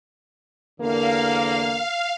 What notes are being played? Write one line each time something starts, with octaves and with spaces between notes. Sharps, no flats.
E2 D3 A#3 F5